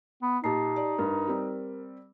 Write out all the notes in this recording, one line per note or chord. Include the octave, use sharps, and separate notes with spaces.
B3
A#2 D#4 G4 A5 C7
D5
G2 A#4
G3 C4